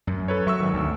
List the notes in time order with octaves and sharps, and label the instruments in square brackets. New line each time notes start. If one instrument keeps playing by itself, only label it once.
[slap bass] F#2
[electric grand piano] A4 B4 C#5
[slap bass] F#3 [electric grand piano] E5 C#6 E6
[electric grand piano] G#1 D#3
[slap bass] D2